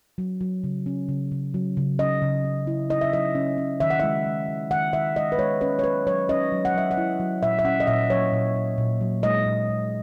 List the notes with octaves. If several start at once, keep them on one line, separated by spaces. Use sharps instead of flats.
F#3
F#3
C#3
C#4
C#3
C#3
F#3
C#3
C#4 D#5
C#3
C#4
E4
E4 D#5
E5
F#3 D#5
C#4
C#4
D#3 E5
F#5
G#3 E5
G#3
D#3
D#3 F#5
D#3 E5
G#3 D#5
B4
G#3 C#5
C#4 B4
C#5
F#3 B4
F#3 C#5
C#4 D#5
F#3
F#5
F#3 E5
F#5
E4
F#3
A#2 E5
E5
C#4 F#5
D#5
A#2 E5
F#3 C#5
A#2
A#2
A#2
F#3
G#3 D#5
A#2
A#2